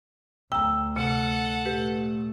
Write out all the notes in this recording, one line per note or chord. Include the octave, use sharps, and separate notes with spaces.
D2 G5 A#5 E6
C3 A4 F#5 C#7
A#2 A3 G4 B4